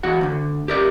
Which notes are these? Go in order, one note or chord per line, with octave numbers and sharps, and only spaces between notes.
E2 F#4 F#5
D2 D3
G4 A#4 D5